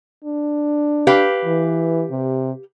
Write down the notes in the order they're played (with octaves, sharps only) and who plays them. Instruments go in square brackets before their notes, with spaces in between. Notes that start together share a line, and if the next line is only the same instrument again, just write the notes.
[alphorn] D4
[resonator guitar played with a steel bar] G4 B4 F5
[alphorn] E3
C3